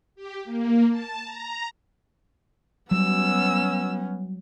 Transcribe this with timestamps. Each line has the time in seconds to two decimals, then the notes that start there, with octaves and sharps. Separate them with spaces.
0.15 G4
0.45 A#3
0.90 A5
1.23 A#5
2.91 F#3 G3 B3 C#4 E6